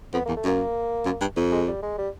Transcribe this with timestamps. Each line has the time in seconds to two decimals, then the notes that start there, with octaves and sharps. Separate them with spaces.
0.13 F2 B3
0.25 E2 A#3
0.36 A3
0.44 F#2 A#3
1.05 F#2
1.21 G2
1.37 F2
1.52 G#3
1.68 G3
1.82 G#3
1.98 G3